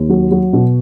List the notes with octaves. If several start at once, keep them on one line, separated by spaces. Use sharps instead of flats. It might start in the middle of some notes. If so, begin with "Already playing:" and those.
Already playing: D#2
F#3
F#3
B2